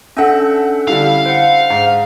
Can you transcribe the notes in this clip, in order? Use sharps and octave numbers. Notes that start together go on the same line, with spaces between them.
C#4 D4 A4 E5 F#5
D3 G3 E4 F5
C5 F#5
G#2